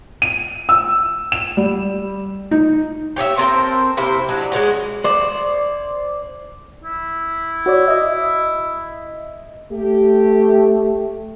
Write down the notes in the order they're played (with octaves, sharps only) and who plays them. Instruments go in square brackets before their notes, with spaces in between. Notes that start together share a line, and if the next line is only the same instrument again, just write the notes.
[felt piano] D#7
E6
E7
G3
D#4
[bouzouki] G4 C#5 D5 E5
C4 A4 A#4 C5
C3 A#3 E4 C5
F#3 D4 D#4
G#3 A3 C#4 F#4
[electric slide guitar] C5 D5
[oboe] E4
[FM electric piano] F#4 C#5 D5
D#5 E5
[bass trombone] A3 [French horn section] G4